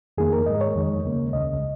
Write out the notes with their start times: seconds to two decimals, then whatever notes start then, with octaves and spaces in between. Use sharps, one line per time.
0.18 F2 D#3 A#3 G#4
0.33 A#4
0.46 G#2 G#3 D#5
0.61 C#5
0.75 F2 D#3 G#3
1.04 D#2 C#3 A#3
1.33 C#2 C#3 G#3 D#5